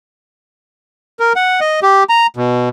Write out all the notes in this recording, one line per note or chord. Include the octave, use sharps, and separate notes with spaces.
A#4
F#5
D#5
G4
A#5
B2